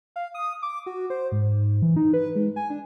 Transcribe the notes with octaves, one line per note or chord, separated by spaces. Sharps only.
F5
D#6
D6
F#4
C5
G#2
E3
D#4
B4
G#3
G#5
D4